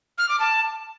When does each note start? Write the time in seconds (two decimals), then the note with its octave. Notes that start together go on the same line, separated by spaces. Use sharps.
0.18 F6
0.29 D6
0.40 A5